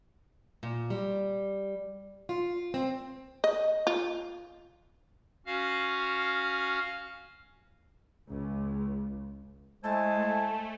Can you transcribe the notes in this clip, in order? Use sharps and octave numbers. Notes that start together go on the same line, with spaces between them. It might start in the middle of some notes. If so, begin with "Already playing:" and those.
A#2
G3
F4
C4
D#5
F4
C#4 F#4 F5 F6
C#2
G#3 A3 E4 C5 G#5 A5